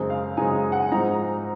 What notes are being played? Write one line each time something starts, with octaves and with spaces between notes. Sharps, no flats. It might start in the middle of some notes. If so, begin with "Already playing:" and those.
Already playing: F#2 C#3 G#3 C4 D#4
F5
F#2 C#3 G#3 C4 D#4 G#5
F#5
G#5
G#2 F3 C4 D#4 A#5